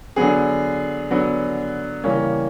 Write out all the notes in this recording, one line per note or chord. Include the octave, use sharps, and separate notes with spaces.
D3 F#3 B3 G#4
D3 F#3 B3
C#3 E3 G3 A#3 C#4